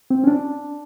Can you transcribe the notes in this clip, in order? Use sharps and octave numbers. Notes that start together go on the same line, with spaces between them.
C4
C#4
D4